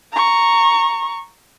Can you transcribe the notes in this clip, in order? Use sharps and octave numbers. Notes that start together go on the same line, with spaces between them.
A#5 C#6